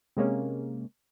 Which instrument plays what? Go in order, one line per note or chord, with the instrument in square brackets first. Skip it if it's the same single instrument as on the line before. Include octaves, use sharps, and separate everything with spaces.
[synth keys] C3 G#3 A#3 C#4